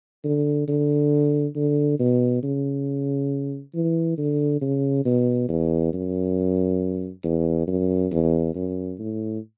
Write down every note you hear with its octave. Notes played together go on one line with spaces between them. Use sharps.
D3
D3
D3
B2
C#3
E3
D3
C#3
B2
E2
F#2
E2
F#2
E2
F#2
A2